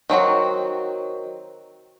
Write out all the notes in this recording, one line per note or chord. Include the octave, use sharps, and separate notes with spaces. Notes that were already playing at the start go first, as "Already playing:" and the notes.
D#3 F#3 C4 F#4